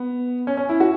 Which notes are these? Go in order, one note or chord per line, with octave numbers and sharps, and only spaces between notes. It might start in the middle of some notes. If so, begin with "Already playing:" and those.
Already playing: B3
C#4
C#4
E4
F#4